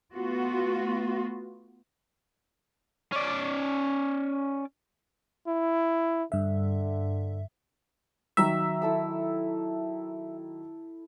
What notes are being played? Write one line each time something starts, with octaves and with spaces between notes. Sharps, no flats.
A3 B3 F4 F#4
C#4 D5
E4
G2 D3 E5
D#3 F#3 E5 A#5
E4 A4 E6